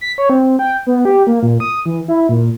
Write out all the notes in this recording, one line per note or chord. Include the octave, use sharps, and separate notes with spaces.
B6
C#5
C4
G5
B3
G4
A#3
A#2
D#6
E3
E4
A#2